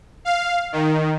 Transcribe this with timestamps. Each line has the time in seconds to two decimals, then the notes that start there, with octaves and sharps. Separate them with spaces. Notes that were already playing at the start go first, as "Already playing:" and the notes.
0.25 F5
0.72 D#3